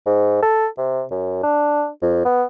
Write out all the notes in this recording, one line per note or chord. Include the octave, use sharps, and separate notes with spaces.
G#2
A4
C3
F#2
D4
F2
B3